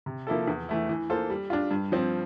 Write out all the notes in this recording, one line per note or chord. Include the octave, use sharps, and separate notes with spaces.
C3
F3 A#3 E4 A4
E2
E3 A3 E4
E3
A#3 F4 A4 C5
G3
D4 F4
G2
F3 C4